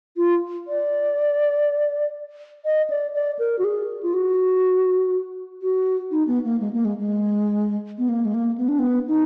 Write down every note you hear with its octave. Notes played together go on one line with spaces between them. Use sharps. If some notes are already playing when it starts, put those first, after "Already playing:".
F4
D5
D#5
D5
D5
A#4
F#4
G#4
F4
F#4
F#4
D#4
B3
A#3
G#3
A#3
G#3
G#3
B3
A#3
G#3
A#3
B3
D4
B3
D#4